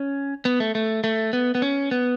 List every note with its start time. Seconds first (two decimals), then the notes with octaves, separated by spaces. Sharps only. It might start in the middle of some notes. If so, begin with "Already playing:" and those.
Already playing: C#4
0.45 B3
0.60 A3
0.75 A3
1.04 A3
1.33 B3
1.55 B3
1.62 C#4
1.91 B3